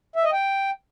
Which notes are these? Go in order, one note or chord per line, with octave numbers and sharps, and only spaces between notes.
E5
D#5
G5